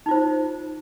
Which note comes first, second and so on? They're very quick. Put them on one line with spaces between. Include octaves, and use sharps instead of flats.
D#4 F4 C5